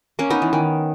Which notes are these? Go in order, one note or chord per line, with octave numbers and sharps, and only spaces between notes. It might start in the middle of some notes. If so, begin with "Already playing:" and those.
A#3 C#4
B3 D#4
E3
D#3